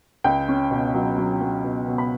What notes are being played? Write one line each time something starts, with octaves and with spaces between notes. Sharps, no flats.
C#2 G5
C#4
B2
F#3
F#3
F#3
B2
B2
B5